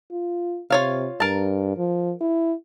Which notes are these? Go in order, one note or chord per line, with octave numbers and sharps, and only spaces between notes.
F4
C3 F4 C#5 F5
G2 A#4 A5
F3
E4